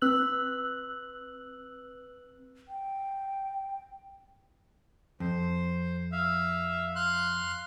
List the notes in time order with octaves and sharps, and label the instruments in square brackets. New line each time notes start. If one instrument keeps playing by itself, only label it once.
[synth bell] C4 B4 E6 F#6 F#7
[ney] G5
[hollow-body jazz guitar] F2 [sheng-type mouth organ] C5
[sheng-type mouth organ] E5 F5
F5 C6 F#6